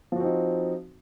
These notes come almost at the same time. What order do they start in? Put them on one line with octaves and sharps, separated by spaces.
F3 F#4 C4 D#4